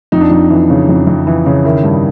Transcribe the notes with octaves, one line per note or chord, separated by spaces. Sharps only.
F2 D#4
D4
F2 D#4
E3
C#3
F2
F2
E3
C#3
D#3 E4
G2